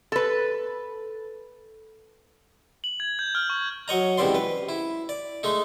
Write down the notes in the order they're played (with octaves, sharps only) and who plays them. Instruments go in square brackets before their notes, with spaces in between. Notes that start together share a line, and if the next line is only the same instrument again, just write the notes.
[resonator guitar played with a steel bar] A4 B4
[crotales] F#7
G#6
G6
F6
C#6
[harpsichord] F#3 C#5 D#5 A#5
C#2 G2 C3 E3 D5 C6
B4
E4
D5
G#3 A3 D#4